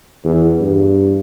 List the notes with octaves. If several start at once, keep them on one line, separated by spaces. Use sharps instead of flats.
E2
G2